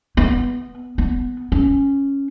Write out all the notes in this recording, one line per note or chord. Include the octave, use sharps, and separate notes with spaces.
B3
B3
C#4